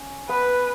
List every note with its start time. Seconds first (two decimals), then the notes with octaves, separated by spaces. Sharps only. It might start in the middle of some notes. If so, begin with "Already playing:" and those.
Already playing: C#4
0.29 B3 B4